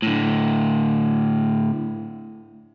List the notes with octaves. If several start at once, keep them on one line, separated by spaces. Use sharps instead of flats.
A2 D3